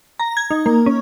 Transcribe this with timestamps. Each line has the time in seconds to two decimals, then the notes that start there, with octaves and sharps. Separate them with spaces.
0.19 A#5
0.37 G#6
0.51 D#4
0.66 A#3
0.86 C#4